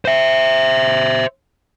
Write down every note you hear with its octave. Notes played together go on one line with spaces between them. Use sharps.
C5 E5